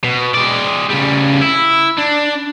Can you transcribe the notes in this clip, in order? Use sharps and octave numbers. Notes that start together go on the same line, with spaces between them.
B2
G#3 D5
C#3 G3
E4
D4